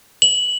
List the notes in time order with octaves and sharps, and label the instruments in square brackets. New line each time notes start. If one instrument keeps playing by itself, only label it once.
[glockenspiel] F#7